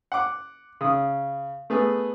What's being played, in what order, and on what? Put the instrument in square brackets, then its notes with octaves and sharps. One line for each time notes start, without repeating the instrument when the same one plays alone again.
[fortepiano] F#5 D6
C#3 D#6
A3 B3 G#4